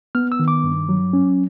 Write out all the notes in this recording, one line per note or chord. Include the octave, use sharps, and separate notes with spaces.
B3 F6
E6
D#3
D6
G2
F#3
C#4